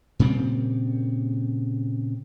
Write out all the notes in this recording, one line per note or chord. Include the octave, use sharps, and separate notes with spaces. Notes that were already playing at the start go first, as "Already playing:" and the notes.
A#2 C#3 G3 C4